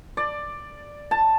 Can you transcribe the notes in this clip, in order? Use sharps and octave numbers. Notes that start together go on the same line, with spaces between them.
D5
A5